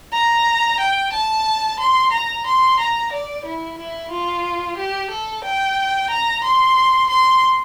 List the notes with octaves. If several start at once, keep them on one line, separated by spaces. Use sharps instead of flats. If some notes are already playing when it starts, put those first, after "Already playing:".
A#5
G5
A5
C6
A#5
C6
A#5
D5
E4
E4
F4
G4
A4
G5
A#5
C6
C6